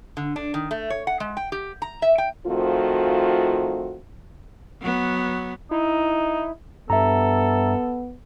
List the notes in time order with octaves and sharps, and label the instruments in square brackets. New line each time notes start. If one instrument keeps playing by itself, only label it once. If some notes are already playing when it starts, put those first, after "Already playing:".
[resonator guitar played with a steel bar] D3
D4
D#3
A3
C#5
F#5
G#3
G5
G4
A#5
E5
G5
[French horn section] D#3 F3 A3 C4 F4 F#4
[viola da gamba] F#3 B3
[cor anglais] D#4 [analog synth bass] E4
[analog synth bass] G2 [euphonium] B3 [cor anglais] A4 [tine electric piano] E5 A#5